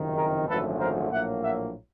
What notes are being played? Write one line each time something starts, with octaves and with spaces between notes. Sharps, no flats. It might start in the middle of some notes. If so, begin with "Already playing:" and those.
Already playing: F#1 F2 C3 D#3
G#4 A#4
G#1 F#2 D3 F3 A3 A4 B4
A#4 C5
A#1 A2 F#3 A#3 E5 F#5
E5 F#5